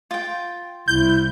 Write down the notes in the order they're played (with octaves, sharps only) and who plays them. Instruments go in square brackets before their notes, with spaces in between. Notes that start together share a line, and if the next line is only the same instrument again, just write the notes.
[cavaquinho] F4 G5
[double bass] C2 C3 [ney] E4 [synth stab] G6